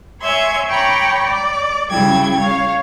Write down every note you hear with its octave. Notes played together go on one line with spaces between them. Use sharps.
C#5 E5 G#5 C6 G#6
C#5 G5 A#5 B5 C#6 D6
D5
C#3 F#3 G3 E4 G5 G#6
C#5 F5